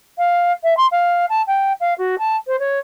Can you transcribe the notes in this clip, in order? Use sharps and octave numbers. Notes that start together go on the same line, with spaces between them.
F5
E5
C6
F5
A5
G5
F5
F#4
A5
C5
C#5